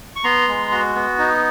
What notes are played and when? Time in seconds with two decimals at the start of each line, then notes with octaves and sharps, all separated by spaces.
0.16 C#6
0.24 B3 A#5 C6
0.48 G#3
0.72 F#4
0.95 B3
1.19 D#4